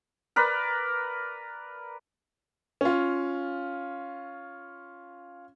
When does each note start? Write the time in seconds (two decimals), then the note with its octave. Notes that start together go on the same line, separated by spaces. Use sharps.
0.36 A#4 B4 D5
2.81 C#4 F4